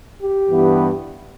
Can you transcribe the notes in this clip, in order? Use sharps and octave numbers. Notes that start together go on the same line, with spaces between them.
G4
G2 E3 B3